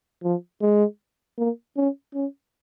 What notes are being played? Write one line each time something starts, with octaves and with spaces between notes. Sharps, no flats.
F3
G#3
A#3
C#4
C#4